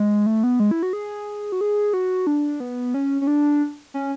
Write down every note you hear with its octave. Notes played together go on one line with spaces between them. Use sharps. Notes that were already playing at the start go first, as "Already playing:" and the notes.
Already playing: G#3
A3
B3
G#3
E4
F#4
G#4
F#4
G#4
F#4
D4
B3
C#4
C#4
D4
C#4